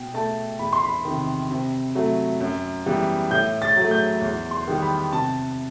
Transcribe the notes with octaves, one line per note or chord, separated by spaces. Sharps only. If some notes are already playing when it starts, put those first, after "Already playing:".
Already playing: B2 G5
A3 A5
E2 B5
C6
B5
C3 D#3
C3
F#3 A3
F#2
E3 G3 B3
A2 G6
A6
F#3
A3
G6
E2
C6
D#3 G3 B3
B5
C3 A5